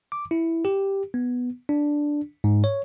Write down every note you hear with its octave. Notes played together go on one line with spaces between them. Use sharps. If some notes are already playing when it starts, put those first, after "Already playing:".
D6
E4
G4
B3
D4
G#2
C#5